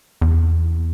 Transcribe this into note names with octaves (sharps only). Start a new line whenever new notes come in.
E2